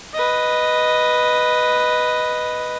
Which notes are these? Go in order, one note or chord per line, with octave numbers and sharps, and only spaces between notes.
B4 D#5